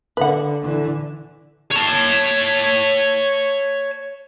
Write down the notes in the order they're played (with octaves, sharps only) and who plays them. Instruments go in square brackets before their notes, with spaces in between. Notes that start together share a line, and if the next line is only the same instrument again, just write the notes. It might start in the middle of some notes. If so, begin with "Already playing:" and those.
[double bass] D3 [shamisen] B4 F#5
[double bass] D3 E3
[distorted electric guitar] C#5 A5